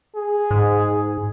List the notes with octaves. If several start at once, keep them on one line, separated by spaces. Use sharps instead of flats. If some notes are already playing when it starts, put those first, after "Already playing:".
G#4
G#2